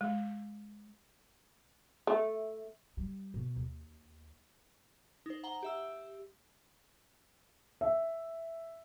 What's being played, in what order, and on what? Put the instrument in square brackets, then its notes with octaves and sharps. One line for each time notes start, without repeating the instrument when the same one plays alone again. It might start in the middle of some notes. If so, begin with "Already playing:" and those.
[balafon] G#3
[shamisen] A3
[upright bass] G3
B2
D#2
[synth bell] D#4 C5
F#5 A#5 G7
G4 E5 E6
[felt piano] E5